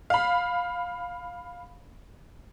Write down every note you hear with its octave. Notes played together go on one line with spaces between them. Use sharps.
F5 B5